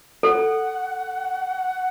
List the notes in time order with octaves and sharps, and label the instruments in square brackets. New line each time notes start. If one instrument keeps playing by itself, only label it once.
[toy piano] A4 [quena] F#5